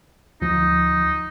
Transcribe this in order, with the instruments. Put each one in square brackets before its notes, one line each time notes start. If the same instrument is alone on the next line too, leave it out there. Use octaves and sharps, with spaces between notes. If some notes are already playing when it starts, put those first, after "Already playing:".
[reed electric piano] D2 F3 [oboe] D#4